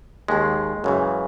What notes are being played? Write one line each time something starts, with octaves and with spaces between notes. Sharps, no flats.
D#2 D#3 G#3
F#2 C#3 E3